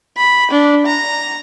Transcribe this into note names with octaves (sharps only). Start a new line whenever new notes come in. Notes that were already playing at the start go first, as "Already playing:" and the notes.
B5
D4
A#5